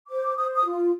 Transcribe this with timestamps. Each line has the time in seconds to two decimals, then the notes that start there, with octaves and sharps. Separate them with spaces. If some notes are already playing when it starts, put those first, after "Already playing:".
0.09 C5 D6
0.36 C5 D#6
0.54 D#6
0.64 F4